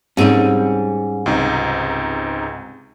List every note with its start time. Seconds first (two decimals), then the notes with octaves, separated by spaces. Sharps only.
0.17 G#2 G3 C4 C#4 G#4
1.26 C#2 C3 D#4